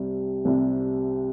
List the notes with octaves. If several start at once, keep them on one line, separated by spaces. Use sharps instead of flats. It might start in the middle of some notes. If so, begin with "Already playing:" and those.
Already playing: C2 C3 G3
C2 C3 G3